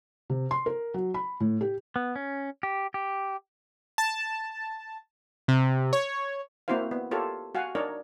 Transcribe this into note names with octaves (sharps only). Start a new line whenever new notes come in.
C3
C6
A#4
F#3
B5
A2
G4
B3
C#4
G4
G4
A5
C3
C#5
A#3 C4 E4 F#4 C5 F5
B3
F4 G4 A4 A#4 C#5
F#4 F5 F#5 G#5
D4 D#4 A#4 C#5 D5